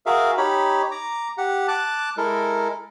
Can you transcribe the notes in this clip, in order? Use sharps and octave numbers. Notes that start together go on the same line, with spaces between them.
F#4 G#4 A#4 E5 F5
D#4 G4 C#5 B5
A#5 D6
G4 F#5
A5 D6 F#6
G#3 E4 A4 A#4